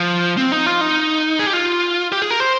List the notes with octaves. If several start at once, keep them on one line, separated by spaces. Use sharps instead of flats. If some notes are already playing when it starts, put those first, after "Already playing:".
Already playing: F3
C4
D#4
F4
D#4
G#4
G4
F4
G4
G#4
A#4
C5